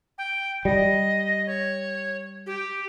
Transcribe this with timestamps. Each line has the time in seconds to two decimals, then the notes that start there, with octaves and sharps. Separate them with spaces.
0.18 G5
0.65 G3 D#5
1.47 C#5
2.46 G4